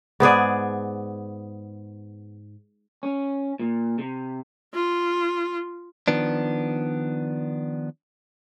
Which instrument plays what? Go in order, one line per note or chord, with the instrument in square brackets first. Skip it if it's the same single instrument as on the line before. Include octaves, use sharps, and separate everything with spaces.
[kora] G#2 B3 G#4 D5
[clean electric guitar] C#4
A#2
C3
[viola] F4
[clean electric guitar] D#3 F3 B3 D4